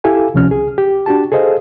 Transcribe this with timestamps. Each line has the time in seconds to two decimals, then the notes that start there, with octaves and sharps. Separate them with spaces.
0.04 E4 G4 A4 F5 G#5
0.34 C#2 C3 F3 C#4 F6
0.49 C2 G#4
0.78 G4
1.06 D4 F#4 G4 A5
1.32 G#4 A4 C5 D#5 F5